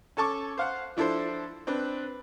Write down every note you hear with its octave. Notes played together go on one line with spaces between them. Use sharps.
C#4 A4 A5 C#6 D6
C5 F5 F#5
F3 D4 E4 A4 C5
C4 D4 B4